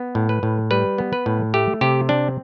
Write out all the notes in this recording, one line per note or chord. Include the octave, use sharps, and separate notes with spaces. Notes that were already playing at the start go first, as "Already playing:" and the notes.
Already playing: B3
A2
B4
A2
G3 B4
B3
B4
A2
A3 G4
C3 G4
C4 D4